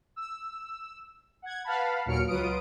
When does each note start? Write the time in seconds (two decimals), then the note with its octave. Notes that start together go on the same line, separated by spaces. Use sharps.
0.16 E6
1.42 F#5 G#6
1.64 B4 F5 F#5 A5 B5
2.06 D#2 A#2 F#3 F6 C#7 D7
2.27 C#2 F#3 F4 B4 D#6 D7